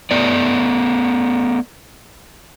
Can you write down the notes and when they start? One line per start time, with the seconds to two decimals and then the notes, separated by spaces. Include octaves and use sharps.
0.11 A3 B3 D5